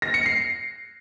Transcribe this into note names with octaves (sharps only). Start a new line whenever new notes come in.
A#6
C#7
C7